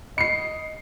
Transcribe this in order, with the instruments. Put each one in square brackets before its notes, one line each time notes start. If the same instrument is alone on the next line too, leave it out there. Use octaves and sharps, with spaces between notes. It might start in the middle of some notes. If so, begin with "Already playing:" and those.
[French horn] D#5 [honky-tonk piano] C7 C#7